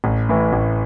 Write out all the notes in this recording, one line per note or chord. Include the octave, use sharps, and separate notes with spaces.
A1
A2 E3
A1